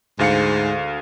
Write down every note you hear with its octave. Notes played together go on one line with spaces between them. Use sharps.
D2 G#2 F5 C#7